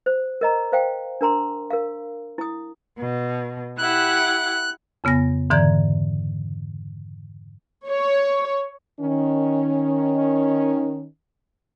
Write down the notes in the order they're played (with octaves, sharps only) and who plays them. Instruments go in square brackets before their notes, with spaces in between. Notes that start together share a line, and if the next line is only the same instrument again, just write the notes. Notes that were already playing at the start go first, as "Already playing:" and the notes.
[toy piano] C5
A#4 D#5 A#5
C5 F5 G5
D4 A#4 A#5 C6
A#4 F5
E4 D#6
[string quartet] B2
[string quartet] E4 G4 F#5 [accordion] F#6
[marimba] F2 C#3 B3 G#5 A#6
G#2 D3 E3 D5 A#5 G#6
[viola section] C#5
[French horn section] D#3 C#4